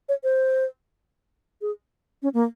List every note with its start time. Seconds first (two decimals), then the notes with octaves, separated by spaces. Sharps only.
0.09 C#5
0.24 C5
1.61 G#4
2.23 C#4
2.34 A#3